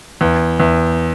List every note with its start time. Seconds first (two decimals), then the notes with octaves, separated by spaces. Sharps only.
0.21 E2
0.60 E2